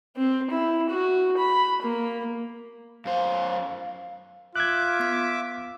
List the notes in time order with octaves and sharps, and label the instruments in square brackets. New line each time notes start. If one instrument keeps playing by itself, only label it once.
[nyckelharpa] C4
E4
F#4
B5
A#3
[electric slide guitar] F#2 C5 [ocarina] F5
[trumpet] F4 [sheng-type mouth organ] E5 D6 [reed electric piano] F#6 G#6
[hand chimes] B3 B6